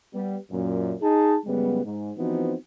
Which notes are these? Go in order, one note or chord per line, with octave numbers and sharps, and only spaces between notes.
G3 B3
F#2 A#2
D#4 G#4 A5
F#2 C#3 G3 G#3 B3
G#2
E3 F3 B3 C4 D#4 F#4